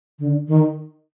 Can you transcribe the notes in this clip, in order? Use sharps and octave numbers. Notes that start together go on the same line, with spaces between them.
D3
D#3